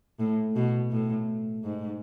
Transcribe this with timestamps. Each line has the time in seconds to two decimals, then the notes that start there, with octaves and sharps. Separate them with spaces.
0.20 A2
0.56 B2
0.91 A2
1.64 G#2